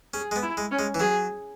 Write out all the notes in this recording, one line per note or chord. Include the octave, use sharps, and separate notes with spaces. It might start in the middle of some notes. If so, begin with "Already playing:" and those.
C#4 G#4
G#3
B3
E4
G#3
C#4
G#3
E3
F#3 G#4